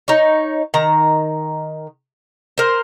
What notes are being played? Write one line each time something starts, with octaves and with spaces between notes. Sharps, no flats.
D#4 C#5
D#3 A#5
A#4 C5